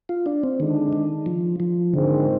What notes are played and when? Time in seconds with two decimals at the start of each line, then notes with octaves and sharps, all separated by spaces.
0.09 F4
0.26 D4
0.43 C4
0.59 D3 D#3 G#3 D4
0.93 D#3
1.26 F3
1.60 F3
1.93 A#1 G#2 D3 D#3 G#3 C4